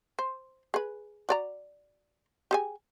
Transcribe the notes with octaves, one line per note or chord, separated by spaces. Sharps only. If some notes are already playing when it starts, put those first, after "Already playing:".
C5
G#4 B4
F#4 D5 A#5
G4 G#4 G#5